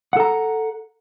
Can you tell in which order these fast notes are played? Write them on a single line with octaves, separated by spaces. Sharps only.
F#5 A4 A#5